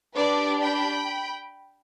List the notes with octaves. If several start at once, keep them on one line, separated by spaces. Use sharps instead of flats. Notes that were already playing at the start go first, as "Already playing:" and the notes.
D4 G4 B4 D5
G5 B5